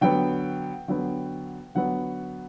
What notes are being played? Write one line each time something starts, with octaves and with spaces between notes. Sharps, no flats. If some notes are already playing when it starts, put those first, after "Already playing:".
D3 F#3 B3 G5
D3 F#3 B3
D3 F#3 B3 F#5